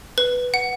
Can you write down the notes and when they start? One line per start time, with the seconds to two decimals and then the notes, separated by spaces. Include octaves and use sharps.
0.18 B4
0.54 F#5